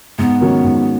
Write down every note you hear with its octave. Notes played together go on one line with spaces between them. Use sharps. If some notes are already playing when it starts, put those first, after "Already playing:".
G#2 B3
D#3 F#3 C#4
G#2